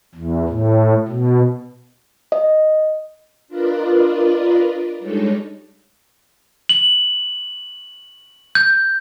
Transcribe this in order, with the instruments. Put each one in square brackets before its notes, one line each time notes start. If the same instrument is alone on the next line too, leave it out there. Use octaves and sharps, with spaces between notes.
[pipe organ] E2
A2
B2
[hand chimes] D#5
[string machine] D4 F4 A#4 B4 D5 D#5
G3 G#3 D4 D#4 A4 C#5
[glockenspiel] F#7
G6